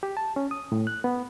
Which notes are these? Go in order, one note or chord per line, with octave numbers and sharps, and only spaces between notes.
G4
A5
C#4
D#6
A2
F#6
B3